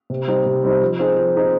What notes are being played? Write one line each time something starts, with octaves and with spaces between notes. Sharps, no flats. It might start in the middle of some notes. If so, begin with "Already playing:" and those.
C3
G3 C4 D#4
C3
G3 C4 D#4
F3
C4 D#4 G#4
F3
C4 D#4 G#4